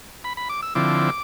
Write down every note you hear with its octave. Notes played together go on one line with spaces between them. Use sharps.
B5
B5
D6
E6
D3 F3 C4 E4 D6